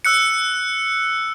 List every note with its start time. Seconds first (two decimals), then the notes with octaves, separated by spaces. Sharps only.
0.05 E6 F#6 C#7